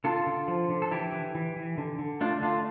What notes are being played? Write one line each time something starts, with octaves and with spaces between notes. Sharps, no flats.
D3 F4 A4
D3
F3
D3
A4
E3 E4 G4
E3
E3
E3
D3
D3
A3 D4 F4
D3 D4 F4